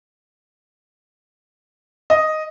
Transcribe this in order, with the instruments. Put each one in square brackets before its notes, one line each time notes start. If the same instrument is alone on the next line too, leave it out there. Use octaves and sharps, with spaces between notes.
[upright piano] D#5